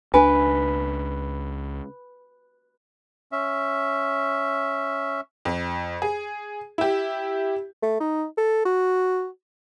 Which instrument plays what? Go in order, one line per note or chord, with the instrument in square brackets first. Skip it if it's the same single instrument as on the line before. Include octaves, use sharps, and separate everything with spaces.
[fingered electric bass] C#2 D4 [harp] B4 [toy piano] G#5
[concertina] C#4 E5
[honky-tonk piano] F2
G#4
E4 G4
[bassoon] A3
D#4
A4
F#4